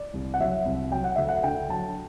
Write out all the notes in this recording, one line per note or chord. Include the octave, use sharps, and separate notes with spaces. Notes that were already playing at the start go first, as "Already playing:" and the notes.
Already playing: D5
C2
F#5
F#3 E5
C2
F#3 G5
F#5
D2 E5
F#5
D3 G5
F#3 A5